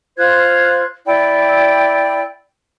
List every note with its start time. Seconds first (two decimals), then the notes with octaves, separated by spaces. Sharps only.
0.17 F4 C5 F#6 G#6
1.05 E4 D5 G5